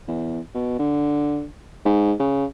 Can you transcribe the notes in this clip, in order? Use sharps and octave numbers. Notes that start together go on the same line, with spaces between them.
E2
B2
D3
G#2
C#3